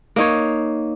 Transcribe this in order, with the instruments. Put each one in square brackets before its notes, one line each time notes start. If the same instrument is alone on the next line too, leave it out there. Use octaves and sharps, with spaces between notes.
[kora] A#3 D#4 C#5